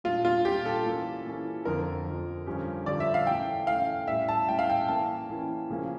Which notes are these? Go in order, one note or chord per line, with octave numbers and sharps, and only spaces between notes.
A#2 G3 D4 F4
F4
A#2 G3 D4 G4
A4
E3 A#3 C#4
E3 A#3 C#4
F2 D3 F3 A#4
F2 D3 F3
G2 D3 F3 C#4 G4
G2 D3 F3 C#4 G4 D5
E5
F5
E3 A3 C#4 G5
E3 A3 C#4 F5
A2 G3 C#4 E5
A5
A2 G3 C#4 G5
F5
G5
E3 A#3 C#4 A5
E3 A#3 C#4
C#3 F3 A#3 C#4